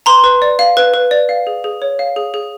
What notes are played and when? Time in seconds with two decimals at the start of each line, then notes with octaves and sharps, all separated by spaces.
0.06 B4 A#5 C6
0.24 B4
0.42 D5
0.59 F5
0.77 B4
0.94 B4
1.11 D5
1.29 F5
1.47 G#4
1.64 G#4
1.82 C#5
1.99 F5
2.16 G#4
2.34 G#4